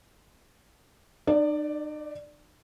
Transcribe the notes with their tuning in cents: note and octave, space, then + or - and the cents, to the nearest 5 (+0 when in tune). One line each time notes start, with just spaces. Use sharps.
D#4 -45 D5 +0